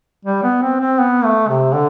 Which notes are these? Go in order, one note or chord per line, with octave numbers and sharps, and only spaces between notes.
G3
B3
C4
C4
B3
A3
C3
D3